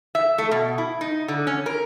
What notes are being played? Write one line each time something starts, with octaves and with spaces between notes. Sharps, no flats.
E5
A3
B2
E4
D#4
D3
C#4
A#4